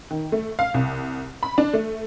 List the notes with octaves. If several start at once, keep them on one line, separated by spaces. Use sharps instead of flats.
D#3
A3
F5
C2
B5
D4
A3